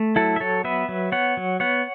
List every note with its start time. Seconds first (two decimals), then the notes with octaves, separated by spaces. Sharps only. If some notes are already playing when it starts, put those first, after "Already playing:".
Already playing: A3
0.16 F#3 E4 A4
0.36 E5
0.40 F#3 A4 C#5
0.64 B3 B4 E5
0.89 F#3
1.12 B3 C#5 F#5
1.37 F#3
1.60 B3 C#5 F#5